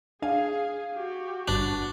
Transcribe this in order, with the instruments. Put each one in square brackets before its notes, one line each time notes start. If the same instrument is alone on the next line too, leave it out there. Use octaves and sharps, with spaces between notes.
[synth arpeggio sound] D4 G#5 [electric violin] G#4 [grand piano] F5
[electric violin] F#4 G4
[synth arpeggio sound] G1 G2 B4 [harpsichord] D4 [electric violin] F#4